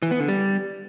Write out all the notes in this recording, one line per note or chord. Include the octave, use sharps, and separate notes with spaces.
E3
B3
D3
G3